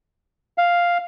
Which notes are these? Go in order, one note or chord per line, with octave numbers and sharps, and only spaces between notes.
F5